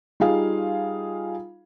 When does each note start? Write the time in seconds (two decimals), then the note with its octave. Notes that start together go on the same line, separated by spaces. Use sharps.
0.20 G3 D#4 F4 G#4 F5